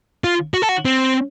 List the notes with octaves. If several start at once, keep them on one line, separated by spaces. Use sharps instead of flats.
F4
F#4
A4
F#4
C4